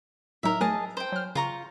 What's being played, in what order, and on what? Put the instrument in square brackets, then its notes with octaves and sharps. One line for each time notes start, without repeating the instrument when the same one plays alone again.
[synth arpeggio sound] A2 F#3 D#4 [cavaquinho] A#4 E5
[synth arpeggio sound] F#3 A3 A#4 [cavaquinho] G#4 D#5 A5
[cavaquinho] C5 G5
[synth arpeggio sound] F#3 F6
[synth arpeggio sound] C#3 [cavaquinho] F4 A#5 C#6